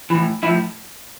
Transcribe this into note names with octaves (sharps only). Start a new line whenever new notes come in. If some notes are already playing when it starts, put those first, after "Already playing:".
A2 E3
A2 F3 E4